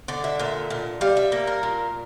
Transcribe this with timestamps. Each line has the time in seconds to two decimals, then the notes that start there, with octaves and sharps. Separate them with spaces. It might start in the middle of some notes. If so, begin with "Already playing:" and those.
0.08 D3 D5
0.24 E5
0.39 A#2 E5
0.70 A#2
1.01 G3 F5
1.17 E5
1.32 A#3
1.47 A#4
1.63 A#2